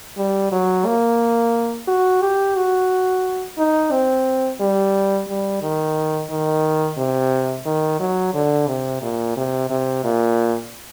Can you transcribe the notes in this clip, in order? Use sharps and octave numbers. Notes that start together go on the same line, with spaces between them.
G3
F#3
A#3
F#4
G4
F#4
D#4
C4
G3
G3
D#3
D#3
C3
D#3
F#3
D3
C3
A#2
C3
C3
A#2